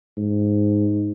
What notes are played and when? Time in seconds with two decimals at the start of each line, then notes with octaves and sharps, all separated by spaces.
0.17 G#2